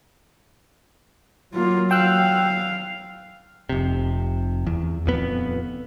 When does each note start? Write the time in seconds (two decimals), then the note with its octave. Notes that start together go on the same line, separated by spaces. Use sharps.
1.54 F#3 A#3 F4
1.91 F5 G5 E6 F#6
3.69 F1 C3
4.67 E2
5.06 D#1 F2 B3